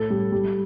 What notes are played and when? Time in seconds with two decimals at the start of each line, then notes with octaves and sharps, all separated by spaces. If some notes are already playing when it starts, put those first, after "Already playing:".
Already playing: A2 A4
0.10 G3
0.32 G3